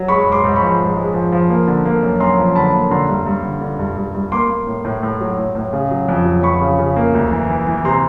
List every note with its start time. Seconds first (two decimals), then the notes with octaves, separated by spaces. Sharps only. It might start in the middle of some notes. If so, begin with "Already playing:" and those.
Already playing: F#3
0.08 G#3 B5 C#6
0.26 G#2
0.32 C6 D6
0.44 G#2
0.55 B5 C#6
0.62 F3
0.79 G#2
0.97 G#3
1.14 F3
1.32 F3
1.50 A#3
1.68 D3
1.85 A#3
2.03 F#2
2.20 F#2 A#5 C6
2.38 F3
2.55 D3 A5 B5
2.73 A#3
2.91 D3 A#5 C6
3.09 G2
3.26 G2
3.43 D3
3.61 D3
3.79 G2
3.97 G2
4.15 G2
4.32 A#3 C6 D6
4.50 A#3
4.67 A2
4.85 A2
5.03 A2
5.20 F#3
5.38 A2
5.55 A2
5.73 C#3
5.91 F#3
6.09 F2
6.25 F#3
6.43 F2 B5 C#6
6.61 C#3
6.79 C#3
6.96 A#3
7.14 D2
7.32 E3
7.50 E3
7.67 E3
7.85 C3 A#5 C6